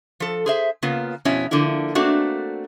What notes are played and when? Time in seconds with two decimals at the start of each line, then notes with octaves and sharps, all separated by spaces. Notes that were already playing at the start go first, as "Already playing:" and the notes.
0.20 F3 A4
0.46 G#4 C5 E5
0.82 C#3 A#3 B3 F4
1.25 F2 B2 C#4 E4
1.51 D3 F3 A#3 E4
1.95 A3 A#3 C4 D4 F#4